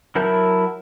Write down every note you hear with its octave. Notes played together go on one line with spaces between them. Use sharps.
F#3 E4 A#4 A5 G6